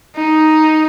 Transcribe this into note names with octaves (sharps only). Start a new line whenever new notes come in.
D#4